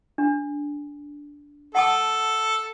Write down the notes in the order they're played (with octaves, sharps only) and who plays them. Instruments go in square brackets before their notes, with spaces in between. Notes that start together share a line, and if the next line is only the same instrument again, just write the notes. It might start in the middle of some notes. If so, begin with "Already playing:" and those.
[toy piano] D4
[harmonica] A4 [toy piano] F#5 A5 D#6